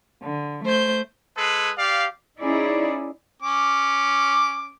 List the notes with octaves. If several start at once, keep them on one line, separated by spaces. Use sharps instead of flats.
D3
A3 C5 G6
G#3 G#4 A4 B4
G4 D5 F5
C#4 D#4 E4 G#4 D5
C#4 D6